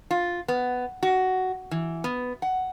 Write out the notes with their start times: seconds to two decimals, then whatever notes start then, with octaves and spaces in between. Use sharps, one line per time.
0.11 F4
0.48 B3
1.03 F#4
1.71 E3
2.04 B3
2.42 F#5